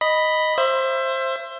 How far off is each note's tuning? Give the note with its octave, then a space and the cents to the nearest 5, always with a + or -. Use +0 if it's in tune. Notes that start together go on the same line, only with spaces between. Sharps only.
D#5 +0 B5 +0
C5 +15 E5 +30